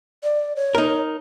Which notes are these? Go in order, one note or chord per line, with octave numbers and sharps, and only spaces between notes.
D5
C#5
D#4 A#4